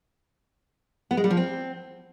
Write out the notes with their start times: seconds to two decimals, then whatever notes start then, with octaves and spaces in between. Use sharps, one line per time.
1.11 B3
1.17 G#3
1.24 G3
1.30 F3
1.37 C4